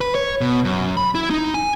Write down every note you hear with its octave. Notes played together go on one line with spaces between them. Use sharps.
B4
C#5
B2
F#2
B5
E4
D#4
G#5